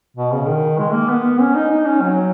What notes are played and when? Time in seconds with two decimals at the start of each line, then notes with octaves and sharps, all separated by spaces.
0.17 B2
0.32 C#3
0.48 D#3
0.79 G#3
0.94 A#3
1.09 B3
1.40 C#4
1.55 D#4
1.71 D#4
1.86 C#4
2.01 F#3